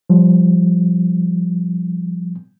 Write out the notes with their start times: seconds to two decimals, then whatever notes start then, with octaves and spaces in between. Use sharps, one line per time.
0.10 F3 G3